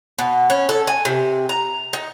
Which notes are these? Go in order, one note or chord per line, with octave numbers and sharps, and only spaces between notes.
B2
C#4
A4
G#5
C3
A#5
D#4